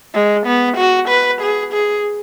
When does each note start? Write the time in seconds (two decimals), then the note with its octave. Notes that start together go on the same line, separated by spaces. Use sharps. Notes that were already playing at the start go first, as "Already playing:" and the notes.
0.14 G#3
0.46 B3
0.77 F#4
1.08 B4
1.41 G#4
1.73 G#4